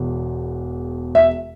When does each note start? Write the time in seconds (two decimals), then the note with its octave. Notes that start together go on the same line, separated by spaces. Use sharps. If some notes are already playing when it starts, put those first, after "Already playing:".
Already playing: E1 E2
1.15 E5